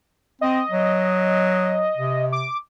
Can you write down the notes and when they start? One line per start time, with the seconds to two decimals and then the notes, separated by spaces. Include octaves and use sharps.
0.41 C4 D#5
0.71 F#3
1.97 C3
2.32 D6